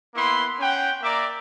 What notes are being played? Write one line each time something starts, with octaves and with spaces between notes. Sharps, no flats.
A#3 B3 E4 B5 C6
C#4 F#5 G5
A#3 D5 E5 A#5 D6